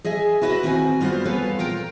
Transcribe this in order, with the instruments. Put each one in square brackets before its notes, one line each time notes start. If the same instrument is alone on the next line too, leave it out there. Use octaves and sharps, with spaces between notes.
[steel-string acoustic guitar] G#4 D#5 E5 G#5
E4 F#4 B4 C5 D#5
D#3 C4 F#4 B4 G#5
G3 B3 F4 F#4 C5
B3 A4 B4 C#5 F5 G#5
A#2 F4 A#4 G5